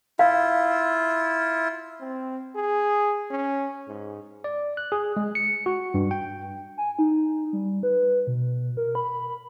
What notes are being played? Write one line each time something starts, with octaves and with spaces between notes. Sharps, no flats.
E4 F4 F5
C4
G#4
C#4
G#2
D5
F#6
G#4
G#3
C#7
F#4
G2
G5
G#5
D#4
G3
B4
B2
A#4
B5